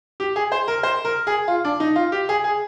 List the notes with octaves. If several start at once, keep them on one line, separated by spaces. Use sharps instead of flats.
G4
G#4
C5
A#4
C5
A#4
G#4
F4
D4
D#4
F4
G4
G#4
G#4